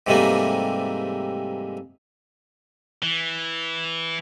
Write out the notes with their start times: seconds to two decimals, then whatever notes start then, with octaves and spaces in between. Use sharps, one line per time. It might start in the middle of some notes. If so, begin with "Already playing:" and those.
0.07 G#2 C3 E3 G3 A3 A#3
3.03 E3